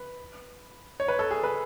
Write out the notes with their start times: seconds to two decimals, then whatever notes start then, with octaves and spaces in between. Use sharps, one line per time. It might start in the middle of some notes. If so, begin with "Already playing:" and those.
Already playing: B4
1.00 C#5
1.08 B4
1.19 A4
1.31 G#4
1.43 B4